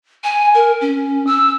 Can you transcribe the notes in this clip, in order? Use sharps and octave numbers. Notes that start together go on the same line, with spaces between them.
G#5
A#4
C#4
E6